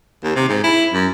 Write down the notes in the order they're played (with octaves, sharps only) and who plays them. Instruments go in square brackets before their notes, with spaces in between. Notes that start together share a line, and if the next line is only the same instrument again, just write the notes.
[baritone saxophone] D#2
C3
G#2
E4
F#2